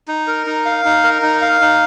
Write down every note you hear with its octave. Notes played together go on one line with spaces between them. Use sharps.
D#4
A#4
D#4
F5
D#4
A#4
D#4
F5
D#4